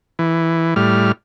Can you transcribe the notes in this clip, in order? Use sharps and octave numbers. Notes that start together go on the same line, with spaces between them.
E3
A2 G3 F6